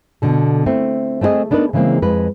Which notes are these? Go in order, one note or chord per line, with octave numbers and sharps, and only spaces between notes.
B2 D3 A4
A3 C4 E4
A3 C4 E4 G#4 D#5
B3 D4 D#4 A#4 B4
C#3 E3 G#3 A#3 C4
F2 G#3 B4